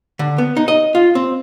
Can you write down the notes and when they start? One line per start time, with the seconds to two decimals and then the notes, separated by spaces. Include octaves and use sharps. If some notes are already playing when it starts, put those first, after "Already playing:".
0.19 D3
0.38 B3
0.57 D#4
0.68 D#5
0.95 F4
1.15 C4